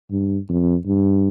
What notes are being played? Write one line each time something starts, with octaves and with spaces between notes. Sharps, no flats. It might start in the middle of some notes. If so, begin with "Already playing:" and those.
G2
F2
G2